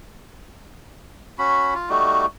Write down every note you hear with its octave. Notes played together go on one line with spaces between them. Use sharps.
C#4 F#4 B5
F4
G3 A3 D#4 F#4